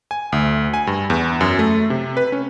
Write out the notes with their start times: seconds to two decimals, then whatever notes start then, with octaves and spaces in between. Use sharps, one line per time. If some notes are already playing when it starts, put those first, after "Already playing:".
0.11 G#5
0.32 D2
0.74 G#5
0.87 G2
1.10 E2
1.41 F#2
1.59 A3
1.90 C3
2.17 B4
2.32 C#4